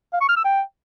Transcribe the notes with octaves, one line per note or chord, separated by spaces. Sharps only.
F5
C#6
F6
E6
G5